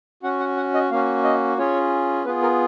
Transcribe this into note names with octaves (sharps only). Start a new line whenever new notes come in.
C#4 F#4 F#5
F#5
F#5
D#5
A#3 C#4 F#4 F5
D#5
C#4 F4 G#4 C#5
B3 F4 G#4 B4
A#4